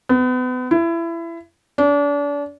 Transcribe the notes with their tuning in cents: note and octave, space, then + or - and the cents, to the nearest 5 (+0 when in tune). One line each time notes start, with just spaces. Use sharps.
B3 +35
E4 +25
D4 -35